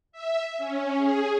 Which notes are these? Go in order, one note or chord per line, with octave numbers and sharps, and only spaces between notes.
E5
C#4
G#4